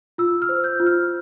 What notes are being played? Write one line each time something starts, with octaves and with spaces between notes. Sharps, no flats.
F4 E6
F6
C5
G6
F4
F6